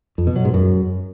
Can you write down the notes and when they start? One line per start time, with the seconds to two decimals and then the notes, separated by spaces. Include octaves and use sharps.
0.18 F2
0.27 B2
0.36 F#3
0.45 G#2
0.54 F#2